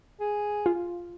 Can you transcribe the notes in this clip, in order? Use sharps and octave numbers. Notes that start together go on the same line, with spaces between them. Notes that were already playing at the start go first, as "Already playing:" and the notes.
G#4
F4